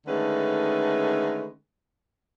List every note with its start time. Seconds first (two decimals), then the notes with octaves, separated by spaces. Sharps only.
0.07 D3 D#3 G#3 A3 C#4 B4